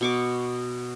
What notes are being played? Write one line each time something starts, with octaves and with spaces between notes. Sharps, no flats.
B2 C#6 D6